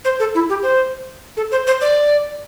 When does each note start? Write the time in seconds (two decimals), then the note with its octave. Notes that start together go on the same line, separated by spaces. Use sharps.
0.05 C5
0.20 A4
0.35 E4
0.49 G4
0.63 C5
1.37 A4
1.52 C5
1.67 C5
1.81 D5